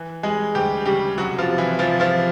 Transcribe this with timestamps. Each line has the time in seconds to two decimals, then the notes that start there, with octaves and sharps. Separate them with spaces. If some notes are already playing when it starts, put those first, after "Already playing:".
Already playing: E3
0.23 G3 G#3 G#4
0.55 D2 G3 G4
0.86 C#3 G3 G4
1.18 C2 F#3 F#4
1.38 F3 F4
1.48 C3
1.58 E3 E4
1.79 C2 F3 F4
2.00 F3 F4